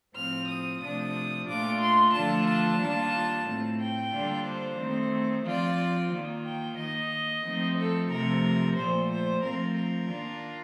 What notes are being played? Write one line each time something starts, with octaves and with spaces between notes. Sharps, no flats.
A2 F3 C4 F6
D#6
C3 F3 A3 D4 D#6
A#2 A3 D4 F4 D6
C6
D3 F3 A3 D4 F4 A5
A5
D#3 G3 A#3 D4 F4
A2 A3 C4
G5
D3 G3 A#3 D4 F4
C5
D#3 A3 C4
F3 C4 F4 D5
D#3 A#3 F4
G5
D#3 A#3 D#4 D#5
F3 A3 C4 D#4
A4
C3 F3 A3 A#4
A#2 F3 A3 C5
C5
F3 A3 C4 F4 A#4
A#4
D#3 A#3 D4 F4